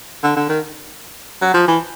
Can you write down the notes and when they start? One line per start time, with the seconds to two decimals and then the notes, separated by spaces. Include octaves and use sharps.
0.23 D3
0.36 D3
0.49 D#3
1.41 F#3
1.54 F3
1.67 E3